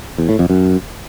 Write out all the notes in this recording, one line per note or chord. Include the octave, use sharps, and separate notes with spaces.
E2
A2
F2
F#2